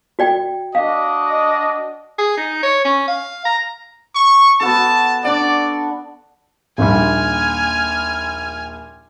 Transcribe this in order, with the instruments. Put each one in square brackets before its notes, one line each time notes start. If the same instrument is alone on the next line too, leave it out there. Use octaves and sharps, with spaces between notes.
[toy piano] F#4 D5 G5
[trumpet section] D4 F#4 D#5 [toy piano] F5
[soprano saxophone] G#4
D#4
C#5
C#4
F5
A#5
[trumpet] C#6
[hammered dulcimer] B3 F#4 A4 [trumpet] A5
[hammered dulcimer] D4 F#5 [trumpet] D5
[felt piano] A#1 D#2 G3 [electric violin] G#5 F6